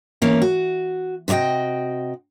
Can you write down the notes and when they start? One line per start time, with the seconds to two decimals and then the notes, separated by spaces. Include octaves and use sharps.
0.22 E3 A#3 B3 C#4
0.42 F#4
1.28 C3 F#4 C#5 D#5 G5